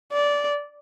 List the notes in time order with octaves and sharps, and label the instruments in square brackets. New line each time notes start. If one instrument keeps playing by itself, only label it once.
[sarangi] D5